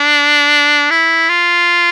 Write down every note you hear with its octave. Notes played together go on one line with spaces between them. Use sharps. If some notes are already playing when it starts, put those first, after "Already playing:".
Already playing: D4
E4
F4